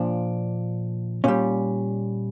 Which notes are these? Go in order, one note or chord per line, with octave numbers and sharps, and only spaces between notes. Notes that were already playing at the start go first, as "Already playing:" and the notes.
Already playing: A#2 F3 D4
A#2 G3 C#4